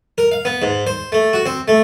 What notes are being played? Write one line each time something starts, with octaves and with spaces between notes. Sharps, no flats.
A#4
F5
B3
G#2
C5
A3
F#4
C4
A3